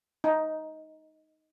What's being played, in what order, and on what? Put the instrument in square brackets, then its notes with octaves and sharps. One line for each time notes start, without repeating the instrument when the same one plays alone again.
[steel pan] D#4